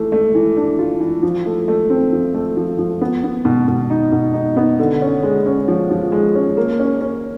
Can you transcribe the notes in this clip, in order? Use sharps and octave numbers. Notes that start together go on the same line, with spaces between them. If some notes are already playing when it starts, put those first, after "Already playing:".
Already playing: E3 A3
A3
E3
D4
F4
E3
F3
A3
A3
C4
F3
A3
F3
F3
B3
B3
B2
B2
D#4
B2
D#4
B3
D3
C#4
G#3
C#4
F3
F3
G#3
C#4
A#3
C#4
C#4